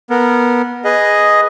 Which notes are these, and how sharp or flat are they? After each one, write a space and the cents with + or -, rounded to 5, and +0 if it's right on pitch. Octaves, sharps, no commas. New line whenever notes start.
B3 -20 A#4 -15
G#4 +0 B4 +0 D#5 +0